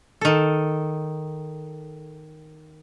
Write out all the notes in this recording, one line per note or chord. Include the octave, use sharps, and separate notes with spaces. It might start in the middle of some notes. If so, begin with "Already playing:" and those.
D#3 A4